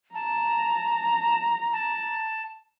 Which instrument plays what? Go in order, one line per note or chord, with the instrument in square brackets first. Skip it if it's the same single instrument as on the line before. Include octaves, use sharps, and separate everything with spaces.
[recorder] A5 [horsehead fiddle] A#5
[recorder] A5